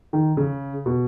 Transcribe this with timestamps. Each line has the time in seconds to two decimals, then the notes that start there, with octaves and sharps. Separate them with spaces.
0.13 D#3
0.37 C#3
0.86 B2